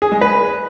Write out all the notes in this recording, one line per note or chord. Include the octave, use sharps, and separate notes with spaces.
G#4
G#3
B4